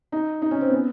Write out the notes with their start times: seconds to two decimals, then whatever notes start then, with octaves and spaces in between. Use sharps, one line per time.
0.12 D#4
0.42 D#4
0.51 C#4
0.61 C4
0.70 B3